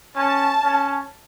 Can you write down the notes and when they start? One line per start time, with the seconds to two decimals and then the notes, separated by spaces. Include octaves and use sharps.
0.16 C#4 A5
0.63 C#4